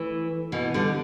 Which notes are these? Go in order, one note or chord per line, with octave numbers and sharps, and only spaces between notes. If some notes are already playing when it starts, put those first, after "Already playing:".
Already playing: E3 A3
B2 E3
D3 G3